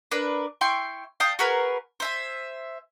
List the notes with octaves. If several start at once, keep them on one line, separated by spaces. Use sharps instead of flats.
D4 A#4 B4
E4 G5 C6 C#6
F5 G5 A5 D#6
F#4 G#4 A#4 B4
C5 E5 G#5